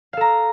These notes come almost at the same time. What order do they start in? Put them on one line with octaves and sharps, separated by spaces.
F5 A4 A#5